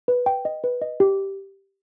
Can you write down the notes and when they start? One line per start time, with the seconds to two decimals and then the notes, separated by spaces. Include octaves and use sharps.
0.08 B4
0.26 G5
0.45 D#5
0.64 B4
0.82 D#5
1.00 G4